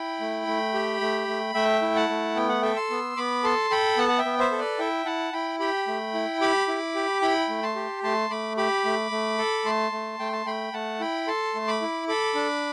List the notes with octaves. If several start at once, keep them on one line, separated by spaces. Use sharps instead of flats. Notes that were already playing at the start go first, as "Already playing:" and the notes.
Already playing: E4 G5 B5
A3
A3
G4
A3
A3
A3 E5 G5
E4
F#5 A5
A3
B3 G5
F#5
A4 E5 G5
C6 E6
B3
B3 B5 D6
A4 A5 C6
A4 G5 B5
B3 F#5 A5
F#5
E5 G5
B3
C5 E5
A4
B4 D5
E4 E5 G5
E4 F#5 A5
E4 G5 B5
G4 G5 B5
A3
E4
G4 B5 D6
E4
G4
E4 G5 B5
A3
A5 C6
G4
A3 A5 C6
A3 B5 D6
G4 B5 D6
A3
A3
A4
A3 A5 C6
A3
A3 G5
A5
A3 G5 B5
A3 F#5 A5
E4 G5 B5
A4 A5 C6
A3
B5 D6
E4
A4 B5 D6
D4